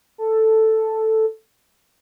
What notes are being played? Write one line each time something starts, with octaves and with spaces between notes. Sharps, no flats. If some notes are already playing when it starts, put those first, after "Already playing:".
A4